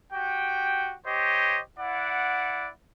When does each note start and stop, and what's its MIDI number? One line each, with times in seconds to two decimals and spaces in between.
0.13 0.95 66
0.13 0.95 67
0.13 0.95 79
1.06 1.60 67
1.06 1.60 72
1.06 1.60 73
1.06 1.60 75
1.79 2.70 64
1.79 2.70 74
1.79 2.70 78